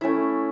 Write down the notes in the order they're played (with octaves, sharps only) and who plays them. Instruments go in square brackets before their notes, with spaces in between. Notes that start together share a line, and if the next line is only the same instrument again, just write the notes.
[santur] A3 C#4 E4 E5